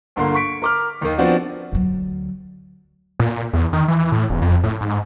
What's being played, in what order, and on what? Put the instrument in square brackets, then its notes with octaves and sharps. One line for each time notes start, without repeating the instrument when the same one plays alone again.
[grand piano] G1 D3 A#3 C6
C#6 B6 D7
A#4 D6 F6
D#2 D#3
F3 B3 C4 D4 F#4
[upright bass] D2 F#3
[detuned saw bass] A#2
E2
D#3
E3
A2
E1
F2
A2
G#2